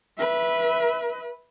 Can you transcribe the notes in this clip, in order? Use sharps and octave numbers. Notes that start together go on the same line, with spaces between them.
B4 E5